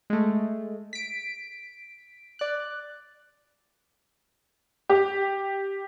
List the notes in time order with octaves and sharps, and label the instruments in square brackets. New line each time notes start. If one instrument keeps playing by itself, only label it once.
[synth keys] G#3 A3
B6 D7
D5 F#6
[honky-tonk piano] G4